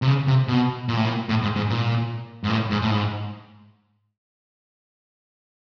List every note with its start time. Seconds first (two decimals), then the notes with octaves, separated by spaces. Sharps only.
0.02 C3
0.07 C#3
0.27 C3
0.48 B2
0.89 A#2
0.97 A2
1.05 A#2
1.29 A2
1.42 G#2
1.56 G#2
1.69 A#2
2.44 G#2
2.50 A2
2.71 G#2
2.82 A2
2.91 G#2